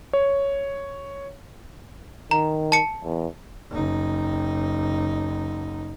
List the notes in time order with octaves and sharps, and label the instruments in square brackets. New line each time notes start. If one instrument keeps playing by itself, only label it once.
[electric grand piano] C#5
[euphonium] D#3 [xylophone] A#5
[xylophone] A5 C#7
[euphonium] E2
[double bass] F#1 D#4